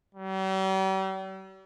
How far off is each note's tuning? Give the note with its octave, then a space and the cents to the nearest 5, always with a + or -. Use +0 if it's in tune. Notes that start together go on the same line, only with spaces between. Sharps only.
G3 -45